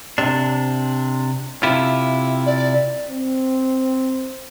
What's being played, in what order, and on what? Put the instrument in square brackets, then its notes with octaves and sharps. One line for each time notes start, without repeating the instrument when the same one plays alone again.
[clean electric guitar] C3 D4
C3 E4 F4
[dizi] D5
[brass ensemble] C4